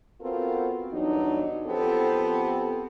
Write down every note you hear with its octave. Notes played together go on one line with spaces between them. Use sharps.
B3 C4 F4 F#4 A4 A#4
E2 F#3 G3 D4 D#4
F3 B3 C4 G4 A4